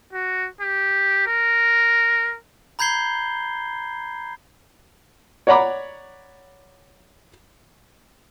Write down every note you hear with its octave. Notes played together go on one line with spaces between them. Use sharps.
F#4
G4
A#4
A#5 B5 G6 G#6 C7 G7
C#5 D5 F#5 A#5 B5 D6